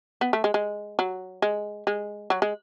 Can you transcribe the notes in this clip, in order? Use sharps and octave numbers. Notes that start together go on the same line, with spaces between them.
B3
A3
G#3
G#3
F#3
G#3
G#3
F#3
G#3